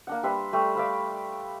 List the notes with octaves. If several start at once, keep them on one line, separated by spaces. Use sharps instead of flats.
A#3 D4 F#5
G3 B4 E5 C6
G3 A3
D5 E5 F5 B5